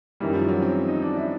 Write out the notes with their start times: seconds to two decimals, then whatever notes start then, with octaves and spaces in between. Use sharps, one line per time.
0.20 F#2 D#3 E3 G3
0.34 F3
0.48 F#3
0.62 C4
0.88 D#4
1.02 D4
1.17 E4